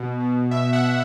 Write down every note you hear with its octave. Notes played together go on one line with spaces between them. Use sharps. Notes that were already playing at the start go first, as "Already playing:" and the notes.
Already playing: B2
B2
B2 E5
F#5
B2